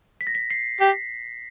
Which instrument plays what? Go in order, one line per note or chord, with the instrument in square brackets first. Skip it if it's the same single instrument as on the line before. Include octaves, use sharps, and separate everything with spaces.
[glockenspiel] B6
A#6
B6
C7
[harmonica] G4 [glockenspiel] B6